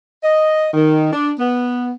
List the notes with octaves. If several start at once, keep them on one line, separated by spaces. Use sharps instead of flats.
D#5
D#3
D4
B3